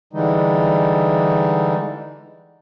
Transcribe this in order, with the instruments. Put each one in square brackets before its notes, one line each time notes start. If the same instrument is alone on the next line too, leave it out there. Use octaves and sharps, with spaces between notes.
[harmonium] D3 E3 G3 G#3 D#4